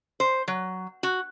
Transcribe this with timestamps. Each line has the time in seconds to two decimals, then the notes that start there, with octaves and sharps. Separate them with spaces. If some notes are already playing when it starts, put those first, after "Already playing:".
0.20 C5
0.48 F#3
1.03 F#4